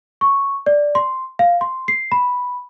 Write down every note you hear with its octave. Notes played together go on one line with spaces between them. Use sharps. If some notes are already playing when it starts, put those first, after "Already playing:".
C#6
D5
C6
F5
C6
C7
B5